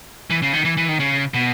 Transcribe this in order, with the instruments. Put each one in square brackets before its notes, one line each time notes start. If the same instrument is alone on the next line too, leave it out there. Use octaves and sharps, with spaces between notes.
[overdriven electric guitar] E3
C#3
D#3
E3
E3
D#3
C#3
B2